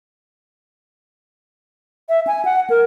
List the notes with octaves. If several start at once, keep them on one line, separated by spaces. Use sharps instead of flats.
E5
G#5
F#5
A#4